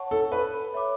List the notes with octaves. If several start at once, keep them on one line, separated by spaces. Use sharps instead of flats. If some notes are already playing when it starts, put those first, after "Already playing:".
Already playing: C#5 F#5 A5 C#6
A4
A4 B4
C#5 E5 B5 D6